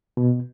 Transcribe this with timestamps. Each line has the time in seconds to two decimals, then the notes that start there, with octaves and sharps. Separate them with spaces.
0.17 B2